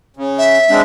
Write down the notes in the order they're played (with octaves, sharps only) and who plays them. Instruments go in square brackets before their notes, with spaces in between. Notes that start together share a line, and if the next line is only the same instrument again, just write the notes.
[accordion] C#3
[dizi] E5
[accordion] G#3 C4 D4